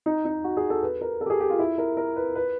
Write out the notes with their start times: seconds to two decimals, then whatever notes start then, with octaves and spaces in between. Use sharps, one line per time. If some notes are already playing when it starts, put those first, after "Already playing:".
0.06 D#4
0.25 D#4
0.44 F#4
0.57 G#4
0.70 A4
0.82 B4
1.01 A#4
1.21 A4
1.26 G4
1.30 G#4
1.40 G4
1.50 F4
1.59 E4
1.78 A#4
1.97 A#4
2.16 B4
2.35 B4